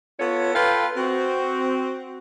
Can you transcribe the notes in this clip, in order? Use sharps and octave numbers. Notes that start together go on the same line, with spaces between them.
B3 F4 A4 C#5
F4 A4 B4 F5 G5
C4 F#4